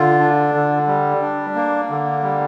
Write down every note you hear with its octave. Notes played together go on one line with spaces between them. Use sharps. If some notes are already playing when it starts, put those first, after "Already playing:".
Already playing: D3 F4
D4
D3
G3
D4
A#3
D3
G3